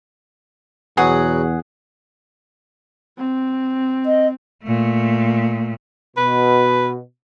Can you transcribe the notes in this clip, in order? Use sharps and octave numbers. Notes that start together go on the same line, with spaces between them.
E2 B2 F#3 G#4 F#5
C4
D#5
A#2 A3
B2 B4